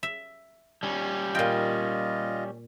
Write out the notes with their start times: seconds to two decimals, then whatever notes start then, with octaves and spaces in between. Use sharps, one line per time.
0.03 E5
0.83 G3 C#4
1.35 A#2 F4 D#5 G5